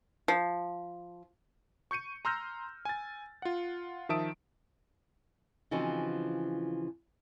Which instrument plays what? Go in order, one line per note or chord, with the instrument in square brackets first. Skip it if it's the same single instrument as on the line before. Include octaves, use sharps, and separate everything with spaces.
[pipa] F3
[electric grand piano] C#6 G6 C#7 D#7
A#5 C6 E6 F6 G6 A#6
G#5 A6
F4 F#5
D#3 F3 E5 A5 D#6 D7
[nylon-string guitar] C#3 E3 F3 C4 D#4 F#4